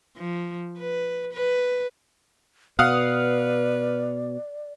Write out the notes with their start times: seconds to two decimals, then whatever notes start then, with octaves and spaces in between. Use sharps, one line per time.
0.17 F3
0.79 B4
1.33 B4
2.79 B2 B4 D5 F5 F#5 D#6